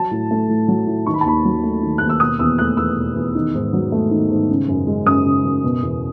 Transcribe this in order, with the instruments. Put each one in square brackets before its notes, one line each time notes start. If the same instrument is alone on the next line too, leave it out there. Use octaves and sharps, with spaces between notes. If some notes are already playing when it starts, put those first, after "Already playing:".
Already playing: [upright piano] F#3 A5
A2
A3
A2
F#3
A2
D#3 C#6
B5
A5
D#2 B5
F#3
A3
D#3
D#2 F#6
E6
B2 D#6
E2 E6
A3 F#6
E2 E6
B2
E2
D#3
G#2
F#3
A3
D#3
G#2
C#3
F#2
G#3
F#2 D#6
C#3
F#2
B2
E2